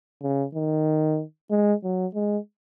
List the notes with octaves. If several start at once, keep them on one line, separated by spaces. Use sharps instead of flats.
C#3
D#3
G#3
F#3
G#3